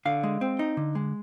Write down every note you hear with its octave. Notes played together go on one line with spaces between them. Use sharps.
D3 F5
G#3
C4
D#4
D3
G#3